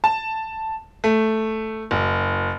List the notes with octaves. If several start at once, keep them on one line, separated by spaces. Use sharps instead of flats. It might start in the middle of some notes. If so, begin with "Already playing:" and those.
A5
A3
F#1